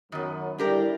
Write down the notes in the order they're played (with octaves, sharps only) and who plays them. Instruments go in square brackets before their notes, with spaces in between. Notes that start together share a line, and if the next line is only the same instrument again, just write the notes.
[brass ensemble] F#2 [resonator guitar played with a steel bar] D#3 B3
[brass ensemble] D3 G3 E4 [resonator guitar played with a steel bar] D4 G4 A#4